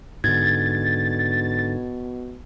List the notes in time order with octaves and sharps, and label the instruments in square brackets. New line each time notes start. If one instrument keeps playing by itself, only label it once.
[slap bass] G#2 D3 [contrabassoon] B2 [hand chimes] G#6 [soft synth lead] A6